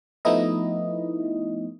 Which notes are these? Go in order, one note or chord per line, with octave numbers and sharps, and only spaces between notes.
F3 A3 B3 D#4 E4 D#5